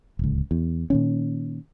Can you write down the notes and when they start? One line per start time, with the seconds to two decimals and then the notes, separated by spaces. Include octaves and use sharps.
0.19 D1 C#2
0.51 E2
0.90 A#2 D#3 C#4